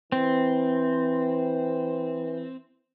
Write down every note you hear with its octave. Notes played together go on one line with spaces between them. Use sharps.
E3 C4